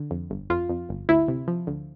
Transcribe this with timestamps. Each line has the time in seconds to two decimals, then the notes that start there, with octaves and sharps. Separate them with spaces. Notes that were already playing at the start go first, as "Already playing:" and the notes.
Already playing: D3
0.11 F2
0.30 G1
0.50 F2 F4
0.70 F2
0.89 G1
1.09 D2 E4
1.28 C3
1.48 F3
1.67 D2